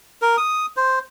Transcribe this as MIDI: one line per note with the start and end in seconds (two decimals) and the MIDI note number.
0.22 0.37 70
0.37 0.66 87
0.76 0.99 72